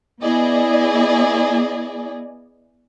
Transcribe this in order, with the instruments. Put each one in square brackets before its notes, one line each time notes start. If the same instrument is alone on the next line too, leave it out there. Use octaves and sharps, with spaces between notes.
[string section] B3 E4 G#4 D5 D#5